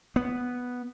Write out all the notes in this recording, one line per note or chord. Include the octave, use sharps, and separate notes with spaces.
B3